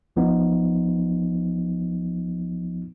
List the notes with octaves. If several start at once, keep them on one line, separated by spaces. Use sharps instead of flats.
B1 F3 B3 D#4